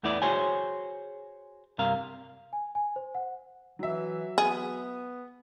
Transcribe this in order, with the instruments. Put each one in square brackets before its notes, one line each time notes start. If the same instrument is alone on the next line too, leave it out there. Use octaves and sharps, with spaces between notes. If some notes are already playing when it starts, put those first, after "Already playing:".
[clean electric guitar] E2 A3 B3 E4 D5
F#4 G#4 C5 C#5 G#5
C2 G2 C3 A#4 F5
[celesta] G#5
G#5
C5
F#5
[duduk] E3 [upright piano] F#3 E5
[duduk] B3 [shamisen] G#4